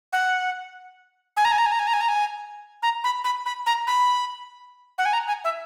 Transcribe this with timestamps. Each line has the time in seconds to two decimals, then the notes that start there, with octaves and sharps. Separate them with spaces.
0.13 F#5
1.37 G#5
1.45 A#5
1.52 G#5
1.58 A#5
1.66 G#5
1.72 A#5
1.79 G#5
1.87 A#5
1.93 G#5
2.01 A#5
2.08 G#5
2.83 A#5
3.04 B5
3.24 B5
3.46 B5
3.66 A#5
3.87 B5
4.98 F#5
5.05 G#5
5.13 A#5
5.28 G#5
5.44 E5